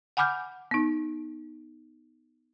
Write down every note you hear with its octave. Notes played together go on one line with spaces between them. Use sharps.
F#5 G#5 B5 D6 F6 G6
B3 D#4